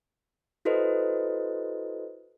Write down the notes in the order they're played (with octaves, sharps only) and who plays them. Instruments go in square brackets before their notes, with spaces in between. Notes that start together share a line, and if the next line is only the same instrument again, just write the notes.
[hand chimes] E4 F#4 A4 B4 C5 D#5